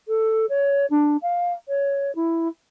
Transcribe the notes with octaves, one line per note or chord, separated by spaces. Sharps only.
A4
C#5
D4
F5
C#5
E4